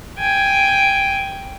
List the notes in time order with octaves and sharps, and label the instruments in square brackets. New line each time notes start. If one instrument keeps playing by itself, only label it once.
[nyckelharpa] G5 G#5